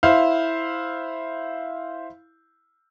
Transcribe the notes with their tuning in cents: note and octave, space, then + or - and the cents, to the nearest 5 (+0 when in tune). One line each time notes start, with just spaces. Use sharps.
E4 -5 C5 +0 F5 +0